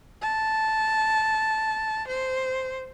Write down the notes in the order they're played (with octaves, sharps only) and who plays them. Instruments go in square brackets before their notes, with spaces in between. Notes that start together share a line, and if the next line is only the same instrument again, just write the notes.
[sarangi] A5
C5